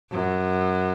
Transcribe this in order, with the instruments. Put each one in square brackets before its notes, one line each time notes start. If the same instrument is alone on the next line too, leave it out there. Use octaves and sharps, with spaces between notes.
[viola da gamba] F#2